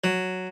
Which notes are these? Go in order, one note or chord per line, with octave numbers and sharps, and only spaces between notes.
F#3